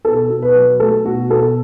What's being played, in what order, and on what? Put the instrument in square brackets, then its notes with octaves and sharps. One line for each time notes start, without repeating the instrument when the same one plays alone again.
[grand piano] B2 A4
B2
B4
F#3
A3 A4
B2 F#4
B2 A4